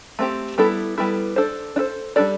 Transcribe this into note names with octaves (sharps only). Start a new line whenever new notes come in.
A3 C4 G4
G3 B3 E4 A4
G3 B3 E4 A4
D4 A4 C5
D4
A4 C5
G3 D4 A4 D5